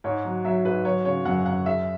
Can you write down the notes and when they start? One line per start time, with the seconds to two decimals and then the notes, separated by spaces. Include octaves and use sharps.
0.04 G#2 C#5
0.25 F#3
0.44 F#3 E5
0.65 G#2 B4
0.85 F#3 C#5
1.05 C#3 C#5
1.25 F#2 F#5
1.46 F#2 F#5
1.66 G#3 E5